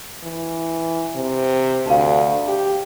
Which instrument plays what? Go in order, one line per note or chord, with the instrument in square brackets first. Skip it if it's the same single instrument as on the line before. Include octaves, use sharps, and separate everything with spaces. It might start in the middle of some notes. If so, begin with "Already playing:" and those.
[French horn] E3
C3
[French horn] D2 [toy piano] F5 A5
[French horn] G4